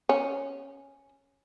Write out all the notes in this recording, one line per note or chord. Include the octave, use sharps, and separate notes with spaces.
C#4